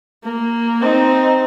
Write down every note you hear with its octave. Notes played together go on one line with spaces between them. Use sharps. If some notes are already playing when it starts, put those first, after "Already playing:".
A#3
C4 D#4